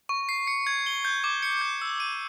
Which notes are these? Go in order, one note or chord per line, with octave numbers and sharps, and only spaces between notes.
C#6
C7
C#7
G#6
G7
G6
D6
C#7
G6
E6
D#7